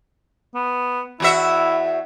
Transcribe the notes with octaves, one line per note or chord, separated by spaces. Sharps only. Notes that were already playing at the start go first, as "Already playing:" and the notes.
B3
E2 E4 F#4 E5